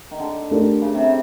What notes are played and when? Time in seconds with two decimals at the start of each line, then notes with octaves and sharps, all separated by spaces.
0.11 D#3
0.19 D3
0.50 A3 D4 G4 A#4
0.82 C#3
0.95 C3